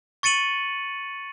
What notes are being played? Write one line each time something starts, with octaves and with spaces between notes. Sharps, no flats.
C#6 A6 C#7 D#7 F#7